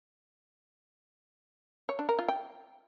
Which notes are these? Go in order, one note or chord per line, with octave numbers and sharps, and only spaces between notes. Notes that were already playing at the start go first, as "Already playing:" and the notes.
C#5
D4
A#4
F4
G5